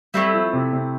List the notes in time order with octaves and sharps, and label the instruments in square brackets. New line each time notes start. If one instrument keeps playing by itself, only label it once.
[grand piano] G3 [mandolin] A3 C4 E4
[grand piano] F3
C3
C3